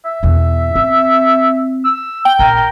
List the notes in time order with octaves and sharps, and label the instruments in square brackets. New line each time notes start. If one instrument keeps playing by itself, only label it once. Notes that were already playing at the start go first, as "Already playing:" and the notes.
[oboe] E5
[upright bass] E2 B2
C4
[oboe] E6
[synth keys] G5
[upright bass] A#1 [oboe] A#4